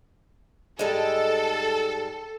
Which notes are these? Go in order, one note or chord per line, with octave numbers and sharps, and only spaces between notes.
G#2 G3 G#3 A4